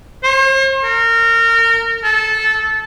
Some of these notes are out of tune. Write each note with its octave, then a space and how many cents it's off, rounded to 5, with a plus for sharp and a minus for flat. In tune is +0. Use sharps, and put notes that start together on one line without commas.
C5 +45
A#4 -25
A4 -15